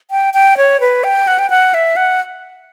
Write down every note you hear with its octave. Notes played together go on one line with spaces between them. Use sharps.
G5
G5
C#5
B4
G5
F#5
G5
F#5
E5
F#5